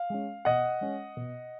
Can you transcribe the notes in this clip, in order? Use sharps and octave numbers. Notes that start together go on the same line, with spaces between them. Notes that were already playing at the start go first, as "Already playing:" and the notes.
Already playing: F5
G#3 C#4
B2 D#5 F#5
G#3 C#4
B2